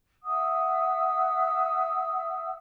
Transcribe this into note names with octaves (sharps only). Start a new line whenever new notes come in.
E5 F#5 D#6 E6